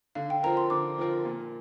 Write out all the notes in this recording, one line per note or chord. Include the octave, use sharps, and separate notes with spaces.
D3 F5
G5
F3 C4 F4 A#4 A#5
C6
D3 D6
F3 C4 F4 A#4
A#2